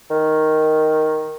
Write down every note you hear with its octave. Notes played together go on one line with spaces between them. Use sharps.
D#3